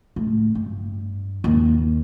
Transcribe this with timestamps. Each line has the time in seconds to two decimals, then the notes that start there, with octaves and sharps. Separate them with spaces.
0.16 A2
0.55 G2
1.44 D#2